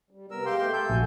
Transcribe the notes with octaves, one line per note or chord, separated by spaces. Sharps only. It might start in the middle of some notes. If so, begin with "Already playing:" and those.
G3
C3 B3 A#4 E6
G#3 G4 F5 G5 C6
A3
A4 G6
A#1 F#4 G#5